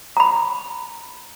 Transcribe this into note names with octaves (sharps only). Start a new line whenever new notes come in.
A#5 B5